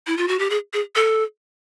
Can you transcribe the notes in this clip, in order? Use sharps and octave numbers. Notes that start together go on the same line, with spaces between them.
E4
F4
F#4
G4
G#4
G#4
A4